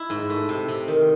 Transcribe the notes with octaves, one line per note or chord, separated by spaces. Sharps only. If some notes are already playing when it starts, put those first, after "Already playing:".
Already playing: E4
G#2
A3
C3
C3
D#3